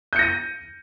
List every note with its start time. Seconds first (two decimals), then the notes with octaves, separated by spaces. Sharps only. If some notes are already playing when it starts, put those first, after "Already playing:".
0.13 G6
0.16 C#7
0.19 A#6
0.22 D#7